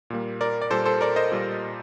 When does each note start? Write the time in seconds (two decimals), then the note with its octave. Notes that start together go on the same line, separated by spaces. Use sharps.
0.10 A#2 G3 A#3
0.41 A#4 D5
0.62 D5
0.71 A#2 G3 A#3 A4 C5
0.85 A4 C5
1.01 A#4 D5
1.16 C5 D#5
1.32 A#2 G3 A#3